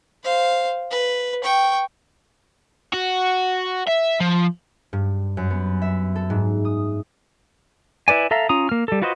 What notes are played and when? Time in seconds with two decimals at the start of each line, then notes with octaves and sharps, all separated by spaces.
0.24 C5 F5
0.91 B4
1.44 G5 C#6
2.94 F#4
3.87 E5
4.21 F3
4.93 G2
5.37 F#2
5.50 B3
5.82 E5
6.16 A4
6.30 G#2
6.65 D#6
8.08 E4 B4 D5 G#5
8.31 A4 E5 F5 A#5
8.49 C#4 F4 A#5 D#6
8.69 A#3 F6
8.88 G3 A4
9.02 F4 F#4 B4 C5 D#5